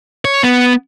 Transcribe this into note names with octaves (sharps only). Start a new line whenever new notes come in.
C#5
B3